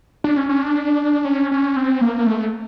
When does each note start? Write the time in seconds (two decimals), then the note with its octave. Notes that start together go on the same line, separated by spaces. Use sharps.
0.24 D4
0.37 C#4
0.49 C#4
0.63 D4
1.25 C#4
1.51 C#4
1.76 C4
2.01 A#3
2.19 A#3
2.27 A3